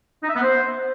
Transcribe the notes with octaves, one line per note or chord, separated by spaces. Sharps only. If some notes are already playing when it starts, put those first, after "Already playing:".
D#4
E5
B3
C5